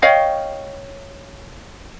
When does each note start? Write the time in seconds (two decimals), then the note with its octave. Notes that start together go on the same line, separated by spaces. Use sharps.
0.02 C#5 D#5 F5 G5